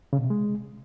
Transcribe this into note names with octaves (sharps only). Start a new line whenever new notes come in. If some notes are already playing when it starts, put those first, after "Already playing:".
C#3
B2
C3
G#3